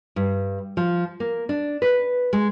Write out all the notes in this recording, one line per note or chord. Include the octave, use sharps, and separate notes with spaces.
G2
F3
A#3
D4
B4
G#3